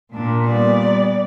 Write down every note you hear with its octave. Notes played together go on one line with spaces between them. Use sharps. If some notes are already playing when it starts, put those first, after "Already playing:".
A#2 D4
G3 B3 D5